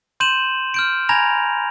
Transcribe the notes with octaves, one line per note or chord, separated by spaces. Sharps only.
C6 G6 D#7 E7 F#7
F6 G6 D7
G#5 A#5 B5 G#6 A#6 F7